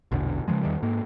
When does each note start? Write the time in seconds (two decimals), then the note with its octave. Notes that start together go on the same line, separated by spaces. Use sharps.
0.12 A#1 E2 B2 D3
0.48 C#3 E3 F3 G#3
0.63 E2 D#3 G3
0.83 G#2 A#3